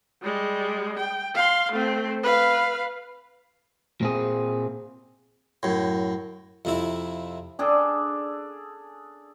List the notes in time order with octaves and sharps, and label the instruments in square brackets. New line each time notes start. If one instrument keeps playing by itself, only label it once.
[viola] G3 G#3
G5
F5 C6
A3 C4
B4 F5
[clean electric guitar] A#2 C4 G#4
[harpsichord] F#2 A2
F2 C3 E4
[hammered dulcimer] D4 G#4 A4 D5